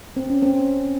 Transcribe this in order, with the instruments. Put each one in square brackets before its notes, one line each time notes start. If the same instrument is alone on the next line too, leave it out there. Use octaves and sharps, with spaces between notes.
[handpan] C4
C#4
C4